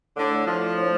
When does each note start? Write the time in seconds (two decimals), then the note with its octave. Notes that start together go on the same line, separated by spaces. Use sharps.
0.16 A2 D3
0.32 A3
0.47 F3 D4
0.63 F4
0.77 A2